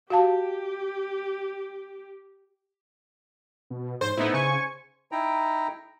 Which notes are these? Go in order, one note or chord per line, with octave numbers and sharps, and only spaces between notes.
F#4 G4 F5 A5
B2
G#2 C5
A2 B3 D#4 E4
C#3 G#5 C#6
D#4 E4 G5 A#5